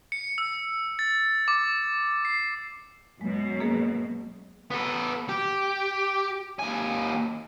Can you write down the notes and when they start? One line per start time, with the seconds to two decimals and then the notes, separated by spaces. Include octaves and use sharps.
0.12 C#7
0.38 E6
0.99 A6
1.48 D6
2.25 C7
3.21 F#2 B2 G#3
3.60 A#3 G#4
4.70 B3 A4
5.29 G4
6.59 D#2 G#5